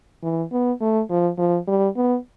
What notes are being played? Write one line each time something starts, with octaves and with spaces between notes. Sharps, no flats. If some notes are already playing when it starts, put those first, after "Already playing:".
E3
B3
A3
F3
F3
G3
B3